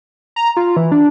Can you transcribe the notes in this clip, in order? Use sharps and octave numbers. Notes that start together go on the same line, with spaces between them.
A#5
F4
E3
D4